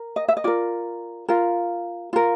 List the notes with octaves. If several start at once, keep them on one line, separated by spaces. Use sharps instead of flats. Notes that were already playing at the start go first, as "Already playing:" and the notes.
Already playing: A#4
D#5
E5
D#5
F4 A#4 D5
F4 A#4
F4 A#4